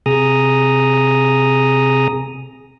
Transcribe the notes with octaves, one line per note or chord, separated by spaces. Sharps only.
C3 G#4 A#5 D#6